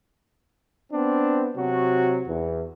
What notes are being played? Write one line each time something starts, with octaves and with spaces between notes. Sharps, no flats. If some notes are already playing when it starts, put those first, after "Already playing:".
B3 C4 D4
C3 F#3 F#4
E2